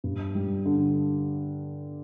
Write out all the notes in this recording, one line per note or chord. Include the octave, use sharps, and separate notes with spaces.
G2
G3
D3